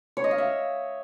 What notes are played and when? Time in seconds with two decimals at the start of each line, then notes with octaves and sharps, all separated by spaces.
0.17 C#5
0.24 D#5
0.31 F5
0.38 E5